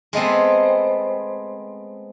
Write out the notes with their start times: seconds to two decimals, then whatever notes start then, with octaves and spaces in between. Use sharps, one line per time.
0.13 G#3 A3 B3 C4